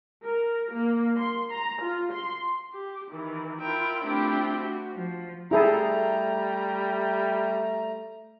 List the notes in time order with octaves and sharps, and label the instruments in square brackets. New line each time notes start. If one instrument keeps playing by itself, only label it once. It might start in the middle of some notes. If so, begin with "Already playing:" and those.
[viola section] A#4
A#3
C6
A#5
F4
C6
[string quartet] G4
D#3 E3
E4 F4 A#4 G5
A3 C4 D4 E4 F4 G4
F#4
F3
[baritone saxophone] G3 [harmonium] A3 A#5 [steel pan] E4 G#4 A4